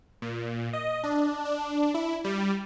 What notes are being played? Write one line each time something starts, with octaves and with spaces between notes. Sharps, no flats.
A#2
D#5
D4
D4
E4
G3